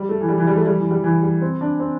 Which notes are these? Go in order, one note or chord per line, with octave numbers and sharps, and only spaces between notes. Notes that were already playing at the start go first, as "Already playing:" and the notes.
Already playing: G3
A3
E3
G3
E3
G3
A3
G3
E3
G3
E3
G3
C4
D4
C4